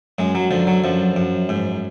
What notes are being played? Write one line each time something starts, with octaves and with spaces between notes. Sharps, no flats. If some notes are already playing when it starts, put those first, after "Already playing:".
F#2 G#3
F#3
D3 F3
F#3
F#2 F3
F#2
G#2